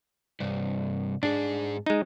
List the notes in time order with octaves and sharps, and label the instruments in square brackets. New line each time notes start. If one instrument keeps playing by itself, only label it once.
[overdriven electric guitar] C2 G2
[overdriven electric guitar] G#2 G#4 [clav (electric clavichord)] D4
[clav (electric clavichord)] G#3 D#4